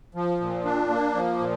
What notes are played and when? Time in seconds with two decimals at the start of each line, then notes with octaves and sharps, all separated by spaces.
0.15 F3
0.40 A#2
0.65 D4
0.90 A#3
1.15 F3
1.39 A#2